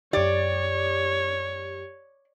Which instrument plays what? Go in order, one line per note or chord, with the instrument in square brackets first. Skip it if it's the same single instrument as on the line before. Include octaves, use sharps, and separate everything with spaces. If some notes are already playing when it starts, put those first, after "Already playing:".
[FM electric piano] F#2 G4 [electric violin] C#5 [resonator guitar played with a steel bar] D5